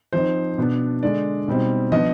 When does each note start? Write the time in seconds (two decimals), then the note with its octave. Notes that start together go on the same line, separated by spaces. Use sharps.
0.13 F3 C4 D#4 C5
0.58 B2 B3 D4
1.03 D3 G#3 D4 D5
1.48 B2 G3 C4 D#4
1.92 F3 B3 D4 D#5